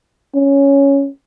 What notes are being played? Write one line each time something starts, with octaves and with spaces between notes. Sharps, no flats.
C#4